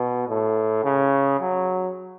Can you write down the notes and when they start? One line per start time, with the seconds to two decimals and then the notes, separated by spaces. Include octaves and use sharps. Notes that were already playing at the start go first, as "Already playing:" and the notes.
Already playing: B2
0.28 A2
0.84 C#3
1.40 F#3